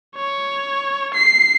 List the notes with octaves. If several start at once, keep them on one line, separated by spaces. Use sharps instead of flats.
C#5
C7